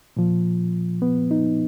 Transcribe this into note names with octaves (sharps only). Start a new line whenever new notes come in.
A#2 F3
B3
D#4